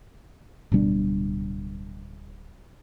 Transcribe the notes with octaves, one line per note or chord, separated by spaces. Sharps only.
D1 B2 G3 D4